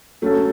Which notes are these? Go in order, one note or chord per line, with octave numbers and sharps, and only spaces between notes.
F#3 A3 C#4 A4